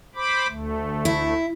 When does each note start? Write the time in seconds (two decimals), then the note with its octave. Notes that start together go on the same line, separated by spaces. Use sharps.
0.15 C5 B5 D6
0.47 D2 A3
1.05 E4